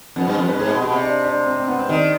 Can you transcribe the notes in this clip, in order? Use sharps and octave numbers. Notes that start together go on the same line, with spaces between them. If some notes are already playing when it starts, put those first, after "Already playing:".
F2 B3
G2 C4
F2
G2 B4
G#2 G#4
B2
B2 G4
C3
D4
D4
C4
C4
B3
C4
D#3 D4